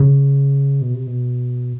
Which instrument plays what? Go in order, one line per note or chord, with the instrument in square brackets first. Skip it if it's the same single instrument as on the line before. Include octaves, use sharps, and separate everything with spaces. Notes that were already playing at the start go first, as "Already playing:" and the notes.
Already playing: [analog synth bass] C#3
B2
C3
B2